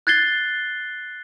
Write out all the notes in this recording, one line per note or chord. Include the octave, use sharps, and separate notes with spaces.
F#6 G#6 A6 C7 G7